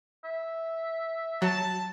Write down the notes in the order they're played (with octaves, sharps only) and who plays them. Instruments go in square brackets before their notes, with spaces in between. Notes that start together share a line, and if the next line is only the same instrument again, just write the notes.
[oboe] E5
[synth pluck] F#3 [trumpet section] A5